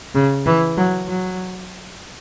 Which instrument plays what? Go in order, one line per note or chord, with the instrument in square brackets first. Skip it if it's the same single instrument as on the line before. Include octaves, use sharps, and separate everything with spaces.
[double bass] C#3
E3
F#3
F#3